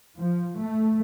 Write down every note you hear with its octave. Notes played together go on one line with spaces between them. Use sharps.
F3
A3